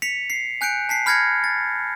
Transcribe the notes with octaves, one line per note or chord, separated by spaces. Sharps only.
B6 C#7 F7
C7
G#5 F#6 G6 C#7 D7
A5 B6 C7
B5 F6 G6 G#6 A#6 C#7
A6